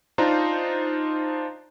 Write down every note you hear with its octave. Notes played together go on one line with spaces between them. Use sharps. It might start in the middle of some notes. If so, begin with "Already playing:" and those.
D4 D#4 F4 C5 A#5